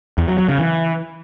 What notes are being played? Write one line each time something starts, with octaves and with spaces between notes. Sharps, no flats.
E2
F#3
F#3
C#3
E3